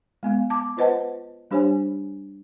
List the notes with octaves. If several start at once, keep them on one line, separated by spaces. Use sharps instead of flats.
G#3 B3 F5
A5 D6
F4 B4 C5 D#5 F#5 A5
G3 D4 G4 C5 C#5 G#5